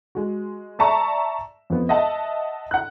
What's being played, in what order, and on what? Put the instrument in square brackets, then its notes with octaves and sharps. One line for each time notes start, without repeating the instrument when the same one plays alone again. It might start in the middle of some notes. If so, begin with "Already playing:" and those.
[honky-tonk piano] G#3 F#4
D5 E5 A5 A#5 C#6
F2 B3
D#5 E5 F#5 A5
F#5 F#6